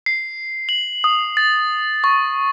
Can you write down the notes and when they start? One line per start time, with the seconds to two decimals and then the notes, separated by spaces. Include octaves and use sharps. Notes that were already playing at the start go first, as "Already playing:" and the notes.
0.06 C7
0.69 F#7
1.04 D#6
1.37 A6
2.04 C#6